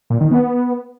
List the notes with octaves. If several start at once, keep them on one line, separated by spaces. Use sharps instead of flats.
A#2
D#3
B3